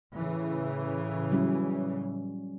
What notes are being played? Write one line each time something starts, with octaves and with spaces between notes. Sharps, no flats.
A2 C#3 E3
F#3 G3 C#4